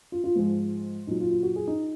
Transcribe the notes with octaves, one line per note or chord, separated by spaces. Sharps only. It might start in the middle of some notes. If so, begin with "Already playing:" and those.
F4
F4
G#2 F3 G#3
A#2 F#3 D#4
F4
F4
F#4
G#4
D#4